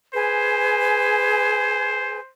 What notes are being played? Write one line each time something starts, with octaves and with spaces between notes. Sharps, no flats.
G#4 B4 C5 G#5